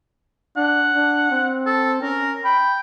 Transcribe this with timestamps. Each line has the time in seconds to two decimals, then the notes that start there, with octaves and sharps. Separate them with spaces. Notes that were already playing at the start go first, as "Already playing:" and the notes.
0.57 D4 F#5
0.95 D4
1.31 C4
1.66 A4
2.02 C#4 A#4
2.44 G5 B5